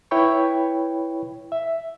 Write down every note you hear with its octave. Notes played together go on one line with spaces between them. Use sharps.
E4 B4 C#5 G5 B5 C#6
E5